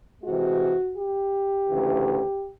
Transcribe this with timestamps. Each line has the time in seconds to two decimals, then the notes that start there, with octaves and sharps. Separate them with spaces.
0.23 C3 E3 G#3 F#4
0.96 G4
1.68 D2 C#3 E3